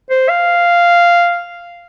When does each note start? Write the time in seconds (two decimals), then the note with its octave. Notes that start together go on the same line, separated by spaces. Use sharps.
0.10 C5
0.29 F5